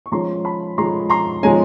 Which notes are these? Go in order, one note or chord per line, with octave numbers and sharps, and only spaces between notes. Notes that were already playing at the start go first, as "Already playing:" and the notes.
C#6
F3 G#3 C#4 A#5 C6
A5 B5
F3 G#3 C#4 A#5 C6
A#5 C6
F3 G#3 C#4 G#5 A#5